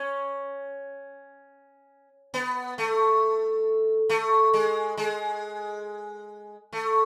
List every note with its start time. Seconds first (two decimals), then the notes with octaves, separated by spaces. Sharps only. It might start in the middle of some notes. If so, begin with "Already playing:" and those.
Already playing: C#4
2.34 B3
2.78 A3
4.09 A3
4.54 G#3
4.97 G#3
6.73 A3